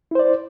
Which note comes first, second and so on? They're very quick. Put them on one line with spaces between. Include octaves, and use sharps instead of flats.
E4 C5 D5